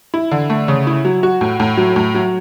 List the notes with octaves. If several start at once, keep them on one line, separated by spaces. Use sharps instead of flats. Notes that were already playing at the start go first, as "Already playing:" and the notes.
E4
D3
A3
C#3
E4
F#3
F#4
A2
A2
F#3
A2
F#3